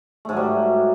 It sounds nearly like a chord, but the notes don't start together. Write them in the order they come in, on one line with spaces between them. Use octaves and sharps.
A3 G#2 F#3 G3